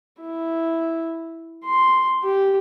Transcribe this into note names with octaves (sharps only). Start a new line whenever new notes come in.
E4
C6
G4